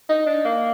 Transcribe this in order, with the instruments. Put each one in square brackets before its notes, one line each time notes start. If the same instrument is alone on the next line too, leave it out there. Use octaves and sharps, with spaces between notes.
[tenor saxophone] D#4
D4
A#3